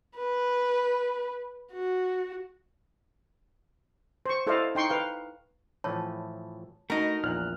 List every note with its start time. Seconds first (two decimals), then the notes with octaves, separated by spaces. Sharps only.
0.17 B4
1.73 F#4
4.26 C5 C#6
4.47 E4 A4 C5 D5 D#5 F5
4.75 D#4 G5 C6 C#6
4.90 B4 F5 G5
5.84 A2 E3 F3 C#5 A5
6.90 A3 D#4 F#4 A#4 D#5
7.24 A#1 E2 A#2 F6 F#6